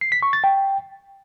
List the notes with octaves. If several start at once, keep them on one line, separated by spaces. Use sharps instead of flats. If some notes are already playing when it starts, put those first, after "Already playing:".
C7
B6
C#6
A6
G5